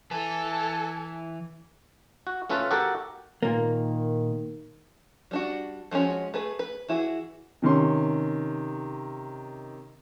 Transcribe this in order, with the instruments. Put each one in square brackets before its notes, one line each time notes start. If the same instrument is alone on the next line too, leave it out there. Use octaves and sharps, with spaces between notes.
[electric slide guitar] E3 B4 [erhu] A4 [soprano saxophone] G#5
[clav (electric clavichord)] F#4
A3 C#4 F4 A4 B4
F#4 G4 A4 A#4 F#5
[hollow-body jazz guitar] A#2 A#3 [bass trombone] D#3
[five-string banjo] G3 D4 F#4
F3 G#3 C4 C#4 F#4
A3 G#4 B4
B4
E3 E4 F#4 G#4
[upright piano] C3 D#3 C#4 C6